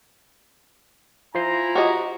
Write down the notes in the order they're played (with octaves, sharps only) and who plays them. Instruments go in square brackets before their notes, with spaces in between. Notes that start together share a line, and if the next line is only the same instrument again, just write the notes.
[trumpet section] E4 G#5 A#5 [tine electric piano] F4 C5 C7
[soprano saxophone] F#4 [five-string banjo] G4 D#5